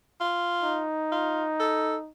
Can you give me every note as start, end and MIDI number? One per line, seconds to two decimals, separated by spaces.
0.20 0.83 65
0.63 2.10 63
1.12 1.44 65
1.60 1.96 69